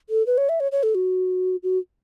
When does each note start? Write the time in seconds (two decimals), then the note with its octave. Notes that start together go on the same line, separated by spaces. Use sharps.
0.10 A4
0.26 B4
0.38 C#5
0.49 E5
0.60 C#5
0.72 C#5
0.83 A4
0.95 F#4
1.63 F#4